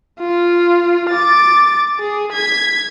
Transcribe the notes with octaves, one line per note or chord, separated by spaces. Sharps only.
F4
D6 A6
G#4
G#6 B6